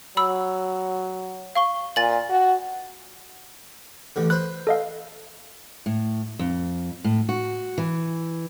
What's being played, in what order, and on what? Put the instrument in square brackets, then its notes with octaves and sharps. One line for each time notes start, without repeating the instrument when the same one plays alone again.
[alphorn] F#3 [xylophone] B5 E6
[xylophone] F5 C#6 G7
[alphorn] A#2 [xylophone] G#5 A6 F#7
[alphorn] F#4
[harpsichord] A1 D3
[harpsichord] B4 C5 [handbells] F#6
[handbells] A4 D#5 F5
[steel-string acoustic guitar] A2
F2
A2
F#4
E3